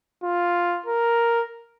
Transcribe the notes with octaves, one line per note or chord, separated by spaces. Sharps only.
F4
A#4